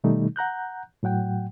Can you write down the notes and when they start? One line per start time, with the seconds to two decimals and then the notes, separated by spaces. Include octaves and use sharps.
0.04 B2 D#3 G3 A3 D#4
0.36 F#5 A#5 F#6 G6
1.03 A2 F#3 F#5 G5